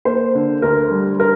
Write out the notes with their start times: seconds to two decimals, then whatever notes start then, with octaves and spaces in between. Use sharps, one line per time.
0.05 A#3 C5
0.35 D3
0.62 D2 A#4
0.91 G3
1.20 A#4